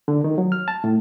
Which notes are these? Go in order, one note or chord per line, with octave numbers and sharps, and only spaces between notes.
D3
D#3
F#3
F6
A5
A2